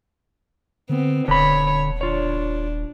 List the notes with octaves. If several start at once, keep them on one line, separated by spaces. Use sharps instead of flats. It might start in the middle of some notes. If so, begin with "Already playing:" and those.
D3 B3 C4
D#1 D3 C#5 B5
D4 F4 C#5